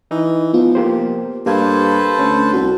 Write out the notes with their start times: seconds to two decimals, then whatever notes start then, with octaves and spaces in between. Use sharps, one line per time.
0.11 E3 D#4
0.54 F3 B3 F4
0.75 A#3 G4 C5
1.46 G2 A#3 G4 A4 B4 C5 F5 G#6
2.19 D2 C#4
2.53 C2 F#4